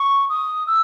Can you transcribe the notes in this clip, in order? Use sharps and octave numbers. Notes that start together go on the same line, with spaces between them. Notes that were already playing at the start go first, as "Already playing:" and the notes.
Already playing: C#6
D#6
E6